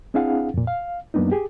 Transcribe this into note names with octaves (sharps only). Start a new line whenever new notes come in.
C4 D4 E4 G#4 F5 F#5
F2 A#2
F5
F#2 F#3 A#3 B3 D4 D#4
G4 G#4